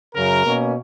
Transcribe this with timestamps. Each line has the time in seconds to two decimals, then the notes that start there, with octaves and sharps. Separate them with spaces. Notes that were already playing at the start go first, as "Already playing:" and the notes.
0.15 F#2 C#3 F#3 A#4
0.44 B2 A#3 C#4